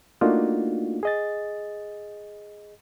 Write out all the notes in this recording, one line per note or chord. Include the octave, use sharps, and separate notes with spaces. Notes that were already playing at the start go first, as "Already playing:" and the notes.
A3 A#3 D4 D#4 F4 F#4
G#4 D#5 A6